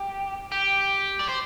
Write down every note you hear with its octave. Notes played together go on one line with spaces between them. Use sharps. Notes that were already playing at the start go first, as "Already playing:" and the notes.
Already playing: G4
G4
D5
C5